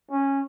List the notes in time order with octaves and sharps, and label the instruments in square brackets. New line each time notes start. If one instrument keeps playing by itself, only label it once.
[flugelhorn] C#4